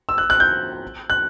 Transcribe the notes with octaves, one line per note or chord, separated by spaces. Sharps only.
E6
F#6
F#6
G6
F#6